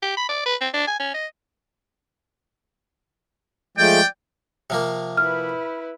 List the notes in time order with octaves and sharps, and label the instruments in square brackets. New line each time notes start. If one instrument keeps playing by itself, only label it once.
[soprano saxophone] G4
B5
D5
B4
C4
D4
G#5
C#4
D#5
[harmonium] F3 G#3 A3 [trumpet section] D5 G5
[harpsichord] C3 F3 A#3
[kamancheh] E4 B4 [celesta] F6